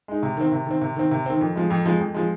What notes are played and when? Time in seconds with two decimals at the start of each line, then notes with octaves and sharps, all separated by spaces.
0.08 G#3 D#4
0.23 C3
0.37 D#3 C4
0.52 C3
0.67 D#3 C4
0.81 C3
0.96 D#3 C4
1.11 C3
1.26 D#3 C4
1.41 F2
1.55 F3 G#3
1.70 F2
1.86 F3 G#3
2.00 F2
2.14 F3 G#3